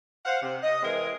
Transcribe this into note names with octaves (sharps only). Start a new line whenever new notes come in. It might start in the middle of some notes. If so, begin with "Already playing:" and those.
C5 F5 F#5
C3
D#5
E3 G#3 C4 G#4 A#4 D#5